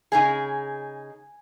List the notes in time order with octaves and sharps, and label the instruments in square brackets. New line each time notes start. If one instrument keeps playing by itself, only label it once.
[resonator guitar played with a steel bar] C#3 D#4 G#4 [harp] G#5